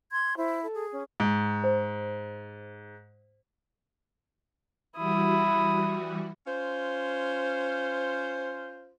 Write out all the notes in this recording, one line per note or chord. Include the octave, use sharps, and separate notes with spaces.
C6 G#6
E4 C5
A4
G#4
C#4
G#2
C5
E3 G3 E4 F#4 D#6
C#4 F4 C5